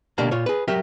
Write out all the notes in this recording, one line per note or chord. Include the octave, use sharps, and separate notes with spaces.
B2 D3 A#3 D4 G4 A#5
A#2 F4 C#5
G#4 B4
F#3 G4 A#4 E5